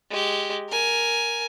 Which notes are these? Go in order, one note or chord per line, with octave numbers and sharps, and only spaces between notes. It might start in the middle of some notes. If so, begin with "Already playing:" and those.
G#3 G4
A#4 G#5